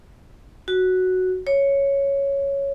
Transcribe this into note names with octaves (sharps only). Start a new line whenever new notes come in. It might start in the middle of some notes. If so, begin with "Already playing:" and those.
F#4
C#5